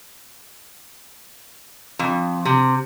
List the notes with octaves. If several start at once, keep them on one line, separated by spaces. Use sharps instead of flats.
F2
C3